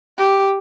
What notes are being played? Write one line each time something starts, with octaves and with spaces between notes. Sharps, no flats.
G4